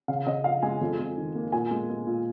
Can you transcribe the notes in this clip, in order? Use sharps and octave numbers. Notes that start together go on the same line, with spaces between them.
C#3 F5
C#3 D#5
F3 F5
G#3 G#5
F2
F2
D#3
A#3
A#2 G#5
G#3
G#3
A#2